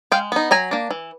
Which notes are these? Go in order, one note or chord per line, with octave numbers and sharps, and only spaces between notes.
G#3 F5 G5
B3 D#4
F#3 G#5 A#5
A#3 D4
E3